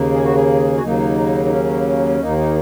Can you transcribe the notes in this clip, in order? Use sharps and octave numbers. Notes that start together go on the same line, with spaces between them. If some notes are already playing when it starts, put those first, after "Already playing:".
Already playing: D#2 C#3 A#3
G#4
F#4
G#4
F#4
D#2 C#3 F#3 A#3 D#4
D#4
C#4
D#2 D#3 A#3 D#4
D#4